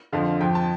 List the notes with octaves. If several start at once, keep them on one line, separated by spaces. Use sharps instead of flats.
F2 D3 F3 F5
F2 F3 G5
A5